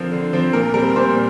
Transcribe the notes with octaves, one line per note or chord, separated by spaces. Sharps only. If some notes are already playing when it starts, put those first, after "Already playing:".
Already playing: D3 F3 C4 A#4
D3
F3 C4
A#2 A#4
G3 C4 A#4
A#2 C5